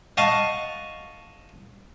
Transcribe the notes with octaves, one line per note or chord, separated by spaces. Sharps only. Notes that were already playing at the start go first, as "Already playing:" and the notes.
D#5 F5 F#5 A5 C#6